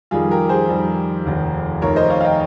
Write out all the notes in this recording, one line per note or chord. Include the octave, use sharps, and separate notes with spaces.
F2 D#3 G3 F4 G#4
G4 A#4
G#4 C5
F2 D#3 G3
F1 D#2 D#3
F1 D#2 D#3 A#4 C#5
C5 D#5
C#5 F5
F5
D#5 G5